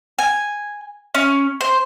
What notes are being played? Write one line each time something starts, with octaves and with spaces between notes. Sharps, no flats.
G#5
C#4
C5